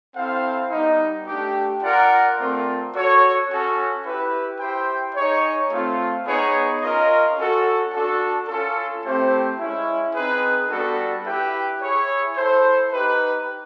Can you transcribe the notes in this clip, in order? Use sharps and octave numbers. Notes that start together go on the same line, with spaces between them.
C4 E4 A4 C5 F5
G3 B3 D#4
A3 D4 G4
F4 A#4 D5 F#5
A3 C4 F4 A#4 D5
F#4 A4 C#5
C#4 F#4 A4
E4 G4 B4
E4 G4 C5 E5 G5
D#4 G#4 C#5
A3 C4 F4
B3 D#4 G#4 C#5
C#4 F4 A#4 D#5
C#4 F#4 A4
D4 F#4 A4
C#4 F4 A4
A3 C4 E4 G4 C5
G#3 C#4 E4
C4 D#4 G#4 B4
G3 B3 D4 F#4 A4
E4 G4 B4 E5 G5
E4 G#4 C#5
E4 A4 C5
D#4 G4 B4